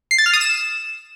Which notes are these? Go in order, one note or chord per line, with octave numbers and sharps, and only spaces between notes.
C7
A6
F6
D#6
E7